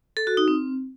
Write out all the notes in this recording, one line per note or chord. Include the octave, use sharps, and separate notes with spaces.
A4
F#4
D#4
C4